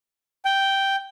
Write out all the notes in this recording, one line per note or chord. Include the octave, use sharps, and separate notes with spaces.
G5